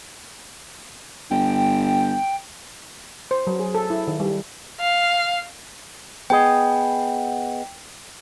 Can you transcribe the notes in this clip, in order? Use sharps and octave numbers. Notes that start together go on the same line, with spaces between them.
G1 G5
C5
F#3
G#4
A4
E4
D#3
G3
F5
B3 G#4 D#5 G5